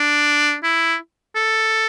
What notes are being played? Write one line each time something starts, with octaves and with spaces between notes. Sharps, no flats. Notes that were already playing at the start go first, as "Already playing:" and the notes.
Already playing: D4
E4
A4